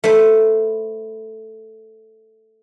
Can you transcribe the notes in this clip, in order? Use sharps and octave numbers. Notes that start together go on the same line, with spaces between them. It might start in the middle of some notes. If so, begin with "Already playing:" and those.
A3 B4 C5